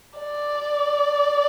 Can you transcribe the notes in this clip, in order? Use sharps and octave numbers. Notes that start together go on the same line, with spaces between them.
D5